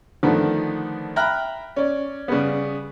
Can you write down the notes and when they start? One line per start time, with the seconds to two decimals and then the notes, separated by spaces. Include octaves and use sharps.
0.23 D3 D#3 F3 A3 B3
1.16 E5 G5 A#5 B5 F6 F#6
1.76 C#4 D5
2.28 C#3 G3 B3